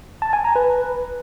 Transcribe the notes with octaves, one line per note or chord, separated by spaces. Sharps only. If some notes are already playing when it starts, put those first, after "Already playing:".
A5
G#5
A#5
B4